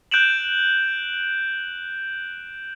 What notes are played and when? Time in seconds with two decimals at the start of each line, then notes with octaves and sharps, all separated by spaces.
0.11 F#6 G6 D7 E7 F#7